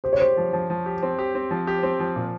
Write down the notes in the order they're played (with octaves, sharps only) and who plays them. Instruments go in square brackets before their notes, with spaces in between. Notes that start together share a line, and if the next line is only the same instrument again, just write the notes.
[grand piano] G4 [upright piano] C5
[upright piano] C#5
[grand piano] G4 [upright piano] C5
[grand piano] F3
F3
F3
G4
C4
G4
C4
F3
G4
C4
F3
A#2